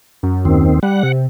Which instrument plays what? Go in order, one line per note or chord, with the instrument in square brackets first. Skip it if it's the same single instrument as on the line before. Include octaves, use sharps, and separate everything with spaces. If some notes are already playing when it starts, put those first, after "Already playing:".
[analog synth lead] F#2
[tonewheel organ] D#2 D#3 C4
[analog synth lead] G3 [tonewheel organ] F#5
[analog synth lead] C3